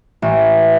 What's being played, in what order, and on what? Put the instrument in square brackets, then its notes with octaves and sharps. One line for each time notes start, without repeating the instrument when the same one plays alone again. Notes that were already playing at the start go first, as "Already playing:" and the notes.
[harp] A1